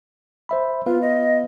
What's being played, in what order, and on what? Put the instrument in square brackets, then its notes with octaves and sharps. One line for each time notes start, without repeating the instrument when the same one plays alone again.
[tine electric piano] C5 E5 B5
[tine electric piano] B3 B4 F5 [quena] F4
[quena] D#5